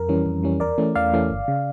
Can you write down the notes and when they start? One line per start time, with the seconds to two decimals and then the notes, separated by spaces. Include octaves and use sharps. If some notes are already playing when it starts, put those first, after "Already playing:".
Already playing: F2 A#4
0.09 E3 G3 C#4
0.26 F2
0.43 E3 G3 C#4
0.60 E2 A#4 D5
0.78 E3 A3 C#4
0.95 E2 D5 F5
1.13 E3 A3 C#4
1.30 G1
1.48 C#3